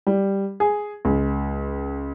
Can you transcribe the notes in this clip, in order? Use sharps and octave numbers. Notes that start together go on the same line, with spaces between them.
G3
G#4
C#2